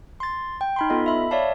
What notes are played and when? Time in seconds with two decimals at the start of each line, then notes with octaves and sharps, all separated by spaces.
0.20 C6 A6
0.61 G5
0.76 D#4 B5 C6
0.90 B3 F4 A4 D#5
1.06 E5 B5
1.31 C#5 D5 E5 F5 A5